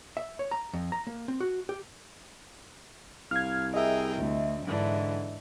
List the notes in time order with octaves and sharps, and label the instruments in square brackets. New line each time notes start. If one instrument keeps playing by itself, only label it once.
[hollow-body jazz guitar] E5
C#5
A#5
F2
A#5
A#3
C4
F#4
G4
[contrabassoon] C2 [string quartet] F5 [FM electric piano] F6 G#6
[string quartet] G#4 A#4 G5 [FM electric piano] D#5 E5
[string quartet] D2
[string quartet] G#2 E3 D4 [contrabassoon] D3